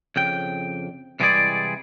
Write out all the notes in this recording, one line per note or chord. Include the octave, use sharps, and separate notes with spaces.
F2 C#3 G5
C2 E3 G3 G#3 G#4 D5